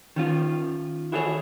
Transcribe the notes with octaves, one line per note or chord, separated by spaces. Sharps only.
D#3 C#4 F4
E4 F#4 G#4 A4 C5 C#5